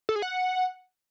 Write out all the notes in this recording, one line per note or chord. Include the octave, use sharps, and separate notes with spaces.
A4
G#4
F#5